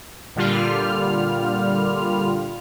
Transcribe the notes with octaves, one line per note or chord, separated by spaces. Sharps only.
A#2 D3 G3 F4 F6